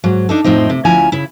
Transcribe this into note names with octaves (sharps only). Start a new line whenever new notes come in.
G#2 F#3
D4 D#4 A4
F2 A2 F3 C4 D#4
C3
D2 F3 C#4 E4 G#5 A#5
C#3 E4